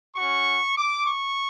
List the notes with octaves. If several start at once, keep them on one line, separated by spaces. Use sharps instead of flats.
C#4 F#4 C#6
D6
C#6